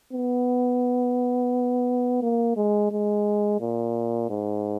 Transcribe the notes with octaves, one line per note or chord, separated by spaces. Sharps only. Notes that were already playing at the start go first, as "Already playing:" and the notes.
B3
A#3
G#3
G#3
A#2
G#2